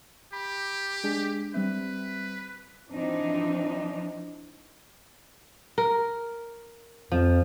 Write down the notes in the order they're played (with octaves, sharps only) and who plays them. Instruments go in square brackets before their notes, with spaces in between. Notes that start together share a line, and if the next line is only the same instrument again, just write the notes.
[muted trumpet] G4 [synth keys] B5
[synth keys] G#3 D4 G#4
[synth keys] G3 C4 E5 [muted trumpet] B4
[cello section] E3 F3 C4 D4 D#4
[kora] A#4
[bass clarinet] F2 [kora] F3